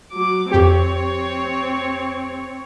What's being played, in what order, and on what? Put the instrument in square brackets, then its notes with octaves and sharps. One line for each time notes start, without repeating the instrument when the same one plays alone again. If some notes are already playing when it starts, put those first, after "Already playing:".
[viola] F#3 D6
[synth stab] F2 G4 [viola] C4 C#5